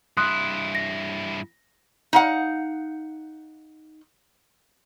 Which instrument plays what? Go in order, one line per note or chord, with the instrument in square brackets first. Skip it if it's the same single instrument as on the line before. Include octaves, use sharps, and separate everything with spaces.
[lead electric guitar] G2 E4 [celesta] C6 D#6 F#6
[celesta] A#6
[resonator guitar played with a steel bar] D#4 F5 F#5